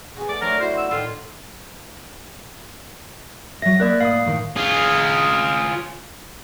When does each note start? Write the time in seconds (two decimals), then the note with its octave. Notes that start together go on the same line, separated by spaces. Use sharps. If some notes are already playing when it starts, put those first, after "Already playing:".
0.17 B3 F#4 G#4
0.29 A3 D5
0.41 F#3 A3 D4 A#4 C#5 C6
0.60 E4 F#4 C5
0.77 E6
0.91 A2 D#3 F4
3.62 F#3 E5 A#6
3.80 A#3 A#4 D5 F#6
4.01 A2 F5 B5 D#6
4.25 A2 D#3
4.56 F4 G#4